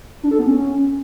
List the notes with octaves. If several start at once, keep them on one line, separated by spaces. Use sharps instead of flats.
D4
A4
B3
C#4